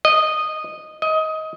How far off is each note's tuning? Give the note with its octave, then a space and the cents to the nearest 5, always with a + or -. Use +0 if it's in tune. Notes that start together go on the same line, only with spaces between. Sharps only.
D#5 -10
D#5 +20